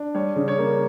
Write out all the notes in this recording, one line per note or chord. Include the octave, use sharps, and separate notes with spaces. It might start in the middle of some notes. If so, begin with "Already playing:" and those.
Already playing: D4
G3 C#5
C#3
C#5
A#3